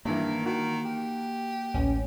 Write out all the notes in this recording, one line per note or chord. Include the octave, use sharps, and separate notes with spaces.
G2 D#3 E3 A#3
D#3 F#4
G4
A1 D2 C#4